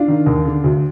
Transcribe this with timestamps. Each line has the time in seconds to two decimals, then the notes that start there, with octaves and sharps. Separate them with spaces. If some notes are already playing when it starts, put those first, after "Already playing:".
Already playing: D4 F4
0.08 D#3
0.26 D#2
0.46 D3
0.64 D2